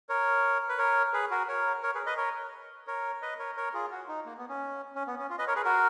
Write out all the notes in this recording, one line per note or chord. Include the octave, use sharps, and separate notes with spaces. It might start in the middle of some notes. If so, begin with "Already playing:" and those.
A#4 C#5
B4
A#4 C#5
G#4 B4
F#4 A#4
A#4 C#5
A#4 C#5
G#4 B4
B4 D#5
A#4 C#5
A#4 C#5
B4 D#5
A#4 C#5
A#4 C#5
F4 G#4
F#4
D#4
A#3
B3
C#4
C#4
B3
C#4
F4
B4 D#5
A#4 C#5
G#4 B4
F#4 A#4